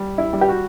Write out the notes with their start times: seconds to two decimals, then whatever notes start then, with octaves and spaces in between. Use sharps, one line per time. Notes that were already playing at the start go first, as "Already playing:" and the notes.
Already playing: G3
0.18 E4
0.33 G3
0.41 G4
0.49 F#4